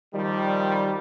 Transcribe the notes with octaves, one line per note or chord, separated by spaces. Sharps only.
D#3 F3 G3